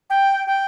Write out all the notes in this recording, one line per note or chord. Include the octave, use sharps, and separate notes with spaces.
G5
G5